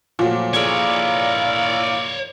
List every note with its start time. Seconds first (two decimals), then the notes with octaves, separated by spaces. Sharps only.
0.19 A#2 F3 F#3 A3
0.53 A#3 D4 E4 G#4 A4 C#5 D5 B5